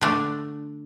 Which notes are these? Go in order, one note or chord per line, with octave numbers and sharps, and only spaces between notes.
D3 A3 D4